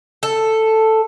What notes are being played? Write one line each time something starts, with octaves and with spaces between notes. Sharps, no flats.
A4